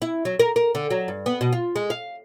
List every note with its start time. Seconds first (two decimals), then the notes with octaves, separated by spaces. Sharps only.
0.02 E4
0.25 F#3
0.39 A#4
0.56 A#4
0.75 D3
0.90 F#3
1.08 G2
1.26 B3
1.41 B2
1.52 F4
1.76 G#3
1.90 F5